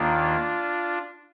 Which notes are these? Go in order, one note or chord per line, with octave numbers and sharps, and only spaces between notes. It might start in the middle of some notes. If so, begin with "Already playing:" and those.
Already playing: D#2 D#3 A#3 D4 F4